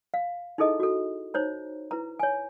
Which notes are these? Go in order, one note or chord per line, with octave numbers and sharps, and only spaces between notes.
F5
D#4 E4 G#4 A4 D#5
F#4 A4
D#4 C5 C#5 A#5
E4 B4 A#5
C#5 G#5